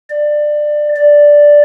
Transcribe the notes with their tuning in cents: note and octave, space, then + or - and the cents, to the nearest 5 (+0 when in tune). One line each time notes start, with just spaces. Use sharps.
D5 +20
D5 +0